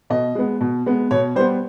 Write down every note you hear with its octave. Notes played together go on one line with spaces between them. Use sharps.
B2 D#5
G#3 B3
B2
G#3 B3
B2 C#5
G3 B3 C5